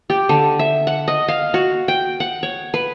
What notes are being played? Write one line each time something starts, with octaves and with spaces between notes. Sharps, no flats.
G4
D3
E5
F#5
D#5
F5
F#4
G5
F#5
C#5
B4